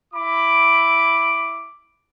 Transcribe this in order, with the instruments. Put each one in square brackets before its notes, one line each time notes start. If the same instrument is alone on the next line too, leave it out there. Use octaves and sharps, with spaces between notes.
[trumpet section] E4 B5 D6